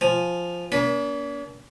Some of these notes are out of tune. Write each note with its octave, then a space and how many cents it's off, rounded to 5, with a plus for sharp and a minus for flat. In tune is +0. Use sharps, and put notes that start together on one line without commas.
F3 +0 G#5 +0
A#3 +40 D4 -45 B5 +0